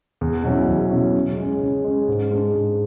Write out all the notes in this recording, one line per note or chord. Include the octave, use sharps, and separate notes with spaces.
E2
B2 F#3 C#4 E4
E2
B2 F#3 C#4 E4
C#3
G#3 C#4
C#3
G#3 C#4
G#2
G#3 D4
G#2